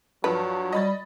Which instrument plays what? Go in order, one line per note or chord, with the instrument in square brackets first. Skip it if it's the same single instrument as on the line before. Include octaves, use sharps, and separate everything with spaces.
[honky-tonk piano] G2 F3 [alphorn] F#3 [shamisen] B4
[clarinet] G3 [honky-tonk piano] D#5 B5 A6